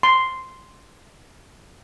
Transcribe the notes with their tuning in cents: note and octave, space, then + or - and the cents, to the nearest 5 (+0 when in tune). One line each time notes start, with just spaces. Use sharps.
C6 -5